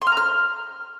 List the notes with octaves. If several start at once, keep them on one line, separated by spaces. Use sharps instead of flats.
C6
F6
A#5
F6